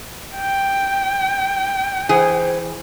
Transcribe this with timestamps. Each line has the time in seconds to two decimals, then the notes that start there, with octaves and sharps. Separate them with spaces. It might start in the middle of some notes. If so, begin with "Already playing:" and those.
0.36 G5
2.09 E3 G#4 C5